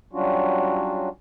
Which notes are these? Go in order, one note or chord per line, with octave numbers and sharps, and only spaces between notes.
F#3 G3 C#4 D4 F4 F#4